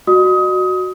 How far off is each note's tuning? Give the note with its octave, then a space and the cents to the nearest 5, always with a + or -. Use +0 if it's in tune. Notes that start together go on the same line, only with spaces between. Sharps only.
F#4 +0 D#5 -45 D#6 +25